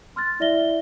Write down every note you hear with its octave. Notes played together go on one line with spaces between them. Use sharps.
C6 F6 F#6 A6
E4 D5 E5 A#6 G7